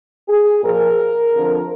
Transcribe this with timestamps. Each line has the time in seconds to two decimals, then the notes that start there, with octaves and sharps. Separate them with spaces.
0.28 G#4
0.63 A#2 F3 A#4
1.34 F2 D3 F3